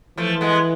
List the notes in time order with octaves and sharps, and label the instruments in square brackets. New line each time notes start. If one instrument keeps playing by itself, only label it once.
[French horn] E3 [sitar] F3 A3
[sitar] G#3 B3